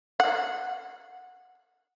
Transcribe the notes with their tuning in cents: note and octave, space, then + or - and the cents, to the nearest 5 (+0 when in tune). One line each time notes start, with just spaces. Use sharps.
F#5 -15